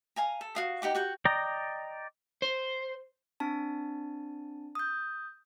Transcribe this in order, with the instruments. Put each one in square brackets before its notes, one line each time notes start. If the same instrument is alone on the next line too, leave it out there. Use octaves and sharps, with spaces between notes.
[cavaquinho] F5 G#5 A#5
A4
F#4 F5 D#6
D#4 G4 F#5 D6
F#4 F#5 G5
[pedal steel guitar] D5 D#5 G5 A#5
[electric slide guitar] C5
[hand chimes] C4 D4 A5
D#6 G6